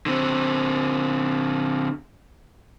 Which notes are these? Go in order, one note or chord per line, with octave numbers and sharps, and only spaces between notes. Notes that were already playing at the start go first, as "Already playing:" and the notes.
D3 C4